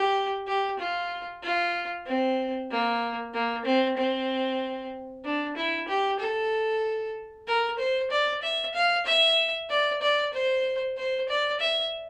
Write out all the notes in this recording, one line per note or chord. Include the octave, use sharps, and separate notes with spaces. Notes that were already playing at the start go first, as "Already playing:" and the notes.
Already playing: G4
G4
F4
F4
C4
A#3
A#3
C4
C4
D4
E4
G4
A4
A#4
C5
D5
E5
F5
E5
D5
D5
C5
C5
D5
E5